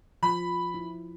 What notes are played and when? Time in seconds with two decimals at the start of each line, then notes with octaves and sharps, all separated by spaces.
0.23 F3 B5
0.74 E4